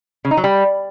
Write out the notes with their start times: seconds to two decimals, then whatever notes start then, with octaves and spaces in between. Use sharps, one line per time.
0.25 C#3
0.31 D#4
0.37 F#3
0.44 G3